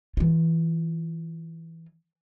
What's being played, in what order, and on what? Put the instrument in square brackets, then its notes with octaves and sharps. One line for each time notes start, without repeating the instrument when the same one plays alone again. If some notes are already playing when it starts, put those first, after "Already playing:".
[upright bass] E3 F4